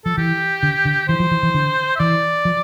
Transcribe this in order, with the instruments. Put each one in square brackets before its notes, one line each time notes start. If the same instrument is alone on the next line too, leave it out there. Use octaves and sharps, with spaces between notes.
[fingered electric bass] F3 [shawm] A4
[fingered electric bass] E3 [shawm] G4
[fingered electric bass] D3
D3
[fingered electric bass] E3 [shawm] C5
[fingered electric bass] F3
E3
E3
D3
[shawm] E5
[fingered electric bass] E3 [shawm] D5
[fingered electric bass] F3